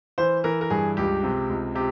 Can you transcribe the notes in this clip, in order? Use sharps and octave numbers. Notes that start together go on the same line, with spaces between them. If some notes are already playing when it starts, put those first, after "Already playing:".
E3 C5
E3 A#4
A#4
G2 G#4
C#2 G4
C3
C#2
C3 G4